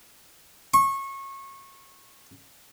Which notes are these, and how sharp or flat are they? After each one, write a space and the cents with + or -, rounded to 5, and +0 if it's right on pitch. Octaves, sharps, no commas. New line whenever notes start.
C#6 -25